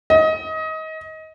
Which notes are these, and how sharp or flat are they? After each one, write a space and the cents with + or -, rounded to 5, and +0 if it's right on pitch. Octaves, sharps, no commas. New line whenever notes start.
D#5 +25